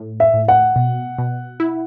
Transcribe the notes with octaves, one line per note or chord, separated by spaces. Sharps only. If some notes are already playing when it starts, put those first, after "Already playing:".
Already playing: A2
E5
A2
F#5
B2
B2
E4